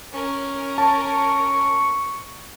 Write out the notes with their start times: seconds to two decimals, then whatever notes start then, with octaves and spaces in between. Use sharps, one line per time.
0.12 C#4 A#4
0.78 A5 C#6